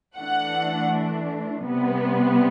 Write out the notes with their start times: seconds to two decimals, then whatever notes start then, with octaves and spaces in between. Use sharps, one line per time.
0.17 E3 A3 D4 F#5
1.65 C3 G3 B3